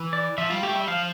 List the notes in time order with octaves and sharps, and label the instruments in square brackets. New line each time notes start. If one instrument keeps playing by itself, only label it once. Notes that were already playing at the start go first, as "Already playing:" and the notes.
Already playing: [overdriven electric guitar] E3
[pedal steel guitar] D5
[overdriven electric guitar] F3 [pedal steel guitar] E5
[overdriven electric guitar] G3 [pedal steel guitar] F4
[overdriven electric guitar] A3 [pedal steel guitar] G4
[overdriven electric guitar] G3 [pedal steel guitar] E5
[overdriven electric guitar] F3 [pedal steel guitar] F5